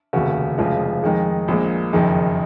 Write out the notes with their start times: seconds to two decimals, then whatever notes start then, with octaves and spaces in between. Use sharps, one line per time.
0.13 F1 D#2 C#3 F#4
0.58 F1 F2 C#3 F3 G#3
1.03 F2 D#3 G#3 G#4
1.48 A#1 A#2 G#3
1.93 F#1 F2 D#3 G#4